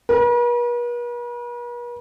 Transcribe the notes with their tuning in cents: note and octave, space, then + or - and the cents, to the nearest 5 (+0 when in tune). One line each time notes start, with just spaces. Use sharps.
B4 -45